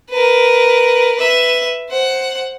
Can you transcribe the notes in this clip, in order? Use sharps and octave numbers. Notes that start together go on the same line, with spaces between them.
A#4 B4
B4 E5
C5 F#5